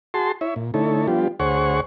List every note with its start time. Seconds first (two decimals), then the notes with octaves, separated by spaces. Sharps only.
0.14 F#4 G#4 A5 C6
0.41 E4 C#5 E5
0.56 A#2
0.74 D3 A3 D#4 E4 A4 C#5
1.07 F3 G3 B3 D4 F4 G4
1.40 D2 G#4 C5 C#5 F#5 C#6